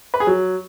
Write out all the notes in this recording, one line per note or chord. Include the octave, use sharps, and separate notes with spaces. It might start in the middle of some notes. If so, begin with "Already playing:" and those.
B4
G#4
F#3